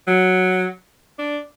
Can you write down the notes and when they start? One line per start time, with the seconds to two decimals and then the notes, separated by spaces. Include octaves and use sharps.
0.07 F#3
1.19 D4